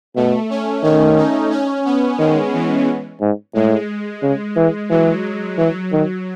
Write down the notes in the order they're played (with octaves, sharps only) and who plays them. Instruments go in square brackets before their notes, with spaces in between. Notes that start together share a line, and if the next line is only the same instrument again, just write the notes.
[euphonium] B2 [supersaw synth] A3
[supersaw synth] C#4
[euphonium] D#3 [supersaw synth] C#4
[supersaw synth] D#4
C#4
B3
[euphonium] D#3 [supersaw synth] G#3
[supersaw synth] E3
[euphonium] G#2
[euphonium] A2 [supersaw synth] G#3
[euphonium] C#3
E3
[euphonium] E3 [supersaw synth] F#3
[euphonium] E3 [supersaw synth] F#3
[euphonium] D#3